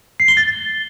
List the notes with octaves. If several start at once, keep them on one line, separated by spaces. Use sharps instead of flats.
C7
G7
A6